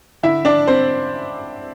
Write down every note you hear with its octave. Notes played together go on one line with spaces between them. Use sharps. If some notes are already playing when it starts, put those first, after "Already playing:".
D3 E4 E5
D4 D5
C4 C5